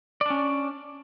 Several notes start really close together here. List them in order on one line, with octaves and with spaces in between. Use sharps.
D5 D4 C#4